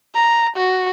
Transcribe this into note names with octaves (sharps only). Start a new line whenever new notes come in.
A#5
F#4